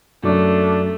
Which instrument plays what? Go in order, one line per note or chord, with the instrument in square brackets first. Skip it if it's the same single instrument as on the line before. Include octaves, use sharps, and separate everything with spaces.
[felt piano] F#2 [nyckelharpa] A3 [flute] D4